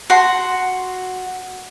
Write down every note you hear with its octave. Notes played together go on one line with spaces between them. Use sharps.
F#4 C6